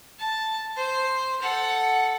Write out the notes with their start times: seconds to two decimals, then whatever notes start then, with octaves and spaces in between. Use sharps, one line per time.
0.18 A5
0.76 C5
1.41 A4 F#5